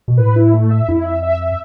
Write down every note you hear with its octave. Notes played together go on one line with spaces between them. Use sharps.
B2
A2 B4
E4
A3
E5
F2 E4
E5
E5
E5